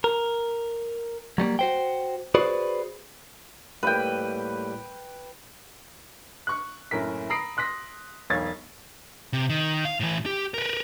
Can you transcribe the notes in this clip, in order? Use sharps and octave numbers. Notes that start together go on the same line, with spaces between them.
A#4
F#3 G3 A3 A#3
F#4 C5 G5
F#4 G#4 B4 C5 D5
A2 G3 A#3 B4 G5
C#6 F#6
F#1 A2 C#4 A#4 B6
A#5 B5 D#6 A#6 C7 D7
C6 F#6 A#6 B6
E1 B1 C#5 F5 G#6 A6
C3
D#3
F5
A2 E3
G4
A#4 B4